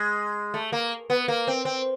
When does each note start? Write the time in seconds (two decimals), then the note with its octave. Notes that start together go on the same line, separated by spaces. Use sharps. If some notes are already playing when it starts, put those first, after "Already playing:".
Already playing: G#3
0.54 A3
0.72 A#3
1.10 B3
1.28 A#3
1.47 C4
1.65 C4